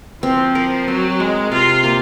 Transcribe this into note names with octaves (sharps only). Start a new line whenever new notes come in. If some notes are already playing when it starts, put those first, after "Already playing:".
F3 C4
A#4
F#3 C4
G#3 A#4
C3 F4
A#3